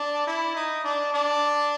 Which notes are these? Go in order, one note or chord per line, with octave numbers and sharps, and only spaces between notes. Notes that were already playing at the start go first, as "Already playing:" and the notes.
Already playing: D4
E4
D#4
D4
D4